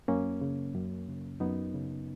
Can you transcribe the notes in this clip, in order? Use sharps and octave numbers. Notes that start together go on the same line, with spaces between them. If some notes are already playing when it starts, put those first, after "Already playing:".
F#2 A#3 C#4
C#3
F#2
C#3
F#2 B3 D#4
C#3